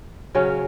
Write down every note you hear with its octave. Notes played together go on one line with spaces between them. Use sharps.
C#3 F#3 C#4